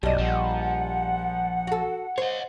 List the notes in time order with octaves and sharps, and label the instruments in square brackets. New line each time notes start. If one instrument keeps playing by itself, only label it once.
[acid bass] B1 [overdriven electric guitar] F#2 [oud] G3 D#5 [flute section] D5 A5
[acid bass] A#1 [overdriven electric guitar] F3 [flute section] F#5
[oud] F#4 A4
[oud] C5 [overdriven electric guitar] C#5 D#5